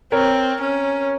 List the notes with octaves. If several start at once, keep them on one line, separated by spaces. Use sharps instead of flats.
C4 A#4 C#5
C#4